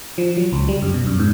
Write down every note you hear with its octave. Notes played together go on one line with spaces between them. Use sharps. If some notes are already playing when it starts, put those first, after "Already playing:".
F3
F#3
C#2
G3
F#2
B2
F#2
G#2